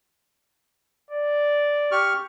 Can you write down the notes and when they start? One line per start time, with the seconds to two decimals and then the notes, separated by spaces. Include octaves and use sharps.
1.11 D5
1.92 G4 C#6 F6